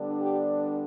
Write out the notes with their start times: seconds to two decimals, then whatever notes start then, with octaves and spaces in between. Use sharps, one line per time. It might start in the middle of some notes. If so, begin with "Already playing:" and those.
Already playing: D3 G3 B3 D4
0.19 G4